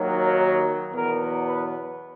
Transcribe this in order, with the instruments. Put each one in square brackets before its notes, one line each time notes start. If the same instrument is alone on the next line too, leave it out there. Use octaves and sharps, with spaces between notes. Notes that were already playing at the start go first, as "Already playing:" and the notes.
Already playing: [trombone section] D#2 D#3 F#3
E2 B2 F#3 B3 A#4
B4